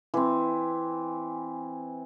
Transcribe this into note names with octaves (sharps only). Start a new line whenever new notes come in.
E3 C4